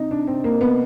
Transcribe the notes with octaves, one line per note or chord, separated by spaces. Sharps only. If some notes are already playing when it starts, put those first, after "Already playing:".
Already playing: C3 D#4
D4
C4
A#3
B3